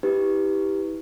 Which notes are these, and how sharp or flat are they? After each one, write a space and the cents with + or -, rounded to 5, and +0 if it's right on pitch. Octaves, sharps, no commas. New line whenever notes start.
E4 -35 G4 +0 B4 +0